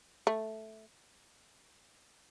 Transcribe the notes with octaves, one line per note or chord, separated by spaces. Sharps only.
A3